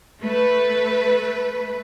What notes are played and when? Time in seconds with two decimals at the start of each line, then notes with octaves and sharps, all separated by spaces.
0.21 A3 B4